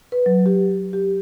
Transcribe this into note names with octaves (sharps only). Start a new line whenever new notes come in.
B4
F#3
G4
G4